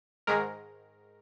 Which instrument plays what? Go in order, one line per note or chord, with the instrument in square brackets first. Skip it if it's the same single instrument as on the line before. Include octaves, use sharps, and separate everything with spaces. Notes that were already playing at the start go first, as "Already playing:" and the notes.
[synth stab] G#2 D#3 G#3 A#4